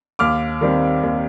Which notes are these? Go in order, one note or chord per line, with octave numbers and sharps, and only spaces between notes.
D#2 D6 F6
D#3 G3 C4
D#2